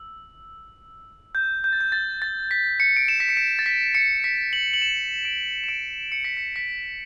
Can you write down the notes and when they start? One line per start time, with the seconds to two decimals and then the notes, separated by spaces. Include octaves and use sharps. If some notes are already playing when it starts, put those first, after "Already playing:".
Already playing: E6
1.35 G6
1.64 G6
1.73 A6
1.81 G6
1.92 A6
2.22 A6
2.51 B6
2.80 C#7
2.96 D7
3.08 E7
3.20 B6
3.29 C#7
3.37 D7
3.59 A6
3.66 B6
3.95 C#7
4.24 B6
4.53 F#7
4.74 F#7
4.82 E7
5.25 D7
5.64 E7
5.69 D7
6.12 C#7
6.25 B6
6.37 C#7
6.56 B6